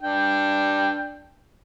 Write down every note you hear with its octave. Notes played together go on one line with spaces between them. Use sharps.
D4 G5